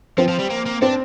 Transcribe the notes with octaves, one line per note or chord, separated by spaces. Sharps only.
F3 C4
F3
G3
A#3
A#3
C4 D4